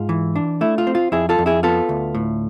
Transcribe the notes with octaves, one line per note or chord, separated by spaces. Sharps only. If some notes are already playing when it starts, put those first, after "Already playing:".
Already playing: G#2 F4
E3
D4
A3 E4
F4
C4
F4
F2 E4 G#4
F4 A4
F2
E4 G#4
B3 F4 A4
D2
A2